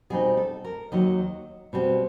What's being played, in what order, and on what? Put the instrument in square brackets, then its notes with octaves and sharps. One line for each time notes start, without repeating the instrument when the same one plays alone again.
[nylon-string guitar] B2 G3 C4 D#4 G#4
A4
A#4
D#2 D#3 F#3 D#5
B2 G3 C4